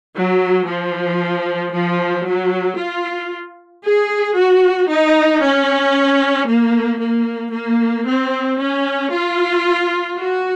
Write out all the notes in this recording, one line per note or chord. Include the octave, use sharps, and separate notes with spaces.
F#3
F3
F3
F#3
F4
G#4
F#4
D#4
C#4
A#3
A#3
A#3
C4
C#4
F4
F#4